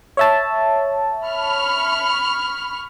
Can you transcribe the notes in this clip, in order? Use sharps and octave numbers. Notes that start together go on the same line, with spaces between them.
C#5 E5 A5
B5 C#6 F6